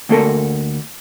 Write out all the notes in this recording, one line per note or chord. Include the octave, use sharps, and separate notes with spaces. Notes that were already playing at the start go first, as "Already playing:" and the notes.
D2 A#3 A4 A#4